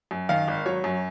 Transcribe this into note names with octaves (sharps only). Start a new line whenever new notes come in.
F#2
D#3 F5
G#1
F#3 C#5
F#2